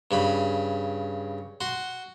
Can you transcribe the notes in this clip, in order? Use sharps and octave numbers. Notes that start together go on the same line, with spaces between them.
G2 C#3 B5
F#4 C6